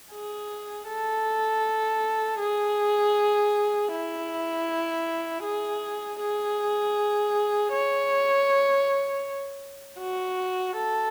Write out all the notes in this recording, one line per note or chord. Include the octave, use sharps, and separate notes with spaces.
G#4
A4
G#4
E4
G#4
G#4
C#5
F#4
A4